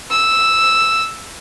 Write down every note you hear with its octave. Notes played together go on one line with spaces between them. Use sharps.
E6